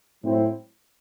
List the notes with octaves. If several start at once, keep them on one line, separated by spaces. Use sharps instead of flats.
A2 F#3 C4 E4